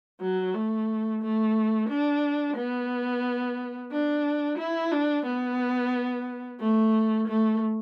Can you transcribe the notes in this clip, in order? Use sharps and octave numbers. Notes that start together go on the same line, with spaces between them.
F#3
A3
A3
D4
B3
D4
E4
D4
B3
A3
A3